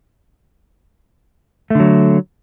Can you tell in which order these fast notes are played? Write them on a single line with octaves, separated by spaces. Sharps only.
A3 D3 F#3